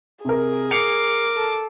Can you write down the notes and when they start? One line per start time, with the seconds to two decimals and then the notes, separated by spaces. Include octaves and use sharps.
0.25 C3 G#4 A#4
0.71 A#4 D6 C7 C#7 F7
1.37 A4